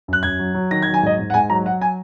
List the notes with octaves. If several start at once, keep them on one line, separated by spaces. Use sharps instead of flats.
F#2 F#6
F#2 G#6
F#3
F#3
D#3 A#6
G#6
F#3
G#5
G#2 D#5
G#2
F#5
G#2 G#5
F#3 A#5
F#3 F#5
G#5